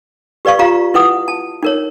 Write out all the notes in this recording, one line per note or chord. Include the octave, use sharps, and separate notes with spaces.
G4 B4 D5 F5 C#6
F4 G4 F5 A#5
E4 B4 F#5 D#6
A5
D#4 A#4 C#5